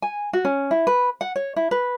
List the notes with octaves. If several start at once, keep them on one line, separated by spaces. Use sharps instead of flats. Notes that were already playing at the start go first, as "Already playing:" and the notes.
G#5
F#4
C#4
E4
B4
F#5
C#5
E4
B4